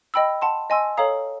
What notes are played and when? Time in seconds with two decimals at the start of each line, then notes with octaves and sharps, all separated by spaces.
0.14 D#5 G5 B5 E6
0.42 F#5 A5 C6
0.70 D#5 G#5 C6 E6
0.97 A4 C#5 F5 A#5 D#6